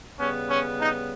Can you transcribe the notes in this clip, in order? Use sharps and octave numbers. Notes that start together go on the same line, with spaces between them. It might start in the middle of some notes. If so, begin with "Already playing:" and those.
C#3 G3 B3 C#4
C#4
D#4